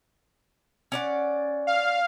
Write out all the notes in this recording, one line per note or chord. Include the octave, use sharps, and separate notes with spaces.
C#4 D5 F#5
F5